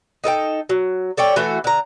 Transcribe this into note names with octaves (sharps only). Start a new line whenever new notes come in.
D#4 A4 A#4 G5
F#3
A4 C#5 D5 G5
E3 A3 F#4 A4
D3 A#5